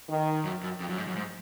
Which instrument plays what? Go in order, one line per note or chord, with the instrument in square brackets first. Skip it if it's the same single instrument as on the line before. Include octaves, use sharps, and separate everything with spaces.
[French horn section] D#3
[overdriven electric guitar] F#2
F#2
F2
F#2
G#2
F#2
G#2